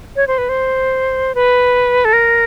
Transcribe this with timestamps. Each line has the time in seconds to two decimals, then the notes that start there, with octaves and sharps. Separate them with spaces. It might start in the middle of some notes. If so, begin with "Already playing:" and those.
0.16 C#5
0.27 C5
0.38 B4
0.49 C5
1.35 B4
2.05 A4
2.13 A#4